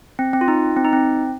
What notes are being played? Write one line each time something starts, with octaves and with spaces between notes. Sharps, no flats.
C4
C4
F4
D#4
C4
D#4
C4